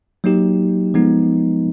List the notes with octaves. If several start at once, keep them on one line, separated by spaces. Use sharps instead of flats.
F#3 A#3 D#4 G4
F3 G#3 B3 D#4